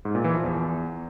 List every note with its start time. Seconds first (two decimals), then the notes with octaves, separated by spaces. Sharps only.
0.05 G#2
0.15 A#2
0.24 E3
0.34 F3
0.44 E2